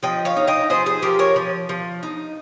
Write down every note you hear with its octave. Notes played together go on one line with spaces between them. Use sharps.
F3 D#5 G5
C#5 F5
D#4
D#5 G5
F3 G#4 C5
G#4 C5
F3 G4 A#4
A#4 C#5
F3
F3
D#4